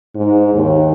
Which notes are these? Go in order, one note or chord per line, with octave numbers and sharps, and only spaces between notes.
G#2
D#2